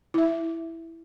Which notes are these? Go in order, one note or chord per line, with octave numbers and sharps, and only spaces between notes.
E4 E5